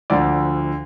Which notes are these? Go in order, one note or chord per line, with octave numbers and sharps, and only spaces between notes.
D2 D3 F3 D5